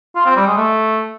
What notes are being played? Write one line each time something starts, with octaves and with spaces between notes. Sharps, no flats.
F4
C4
G3
G#3
A3